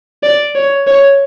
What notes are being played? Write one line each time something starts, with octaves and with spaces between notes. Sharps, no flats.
D5
C#5
C#5